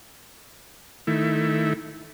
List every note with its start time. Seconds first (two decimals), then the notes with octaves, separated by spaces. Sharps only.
1.07 D#3 A3 E4